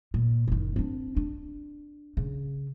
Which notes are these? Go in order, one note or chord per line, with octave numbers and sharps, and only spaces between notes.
A#2
F#1 D#3
C4 D4
D4
C#3